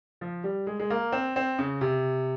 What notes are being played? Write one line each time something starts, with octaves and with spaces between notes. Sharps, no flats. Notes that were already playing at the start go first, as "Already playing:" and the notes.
F3
G3
G#3
G#3
A#3
C4
C4
C#3
C3